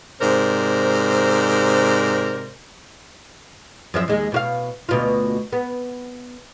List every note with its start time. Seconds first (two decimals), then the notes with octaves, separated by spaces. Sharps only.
0.20 G#2 C3 A#4 C5 D5
3.94 F#2 F3 E5
4.08 D#2 G#3
4.32 B2 F#4 F5
4.89 D2 B2 F4
5.53 B3